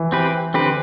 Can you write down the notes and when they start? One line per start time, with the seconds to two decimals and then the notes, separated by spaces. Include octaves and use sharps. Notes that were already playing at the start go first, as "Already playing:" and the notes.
Already playing: E3
0.12 C4 G4 B4
0.54 D3 C4 G4 B4